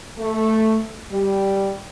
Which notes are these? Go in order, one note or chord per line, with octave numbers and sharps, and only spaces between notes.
A3
G3